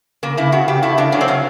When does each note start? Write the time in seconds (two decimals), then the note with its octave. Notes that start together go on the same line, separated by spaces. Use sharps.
0.23 C#3 A#3
0.37 C#3 E4
0.52 C#3 F#4
0.68 C#3 G4
0.83 A3 E4
0.98 C#3 D4
1.12 F#3 C#4
1.21 C4
1.28 C#3 C#4